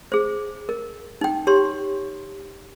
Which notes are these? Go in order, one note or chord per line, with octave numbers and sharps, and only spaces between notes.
G#4 C5
A#4
D#4 G5
G4 C#5 C6